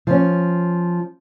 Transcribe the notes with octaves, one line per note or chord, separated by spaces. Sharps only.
F3 C#4